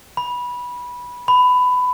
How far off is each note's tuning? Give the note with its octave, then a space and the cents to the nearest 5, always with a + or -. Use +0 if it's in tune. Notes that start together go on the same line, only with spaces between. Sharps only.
B5 -15
B5 +15